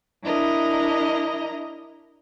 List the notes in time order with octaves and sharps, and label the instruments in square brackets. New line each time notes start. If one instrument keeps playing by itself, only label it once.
[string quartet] D4 E4 A#4 D#5 A#5